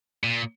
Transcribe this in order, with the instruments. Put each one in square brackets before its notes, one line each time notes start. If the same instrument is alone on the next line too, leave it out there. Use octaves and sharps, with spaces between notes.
[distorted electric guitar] A#2